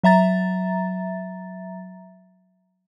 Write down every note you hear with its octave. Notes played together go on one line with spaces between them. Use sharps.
F#3 E5 A#5 A6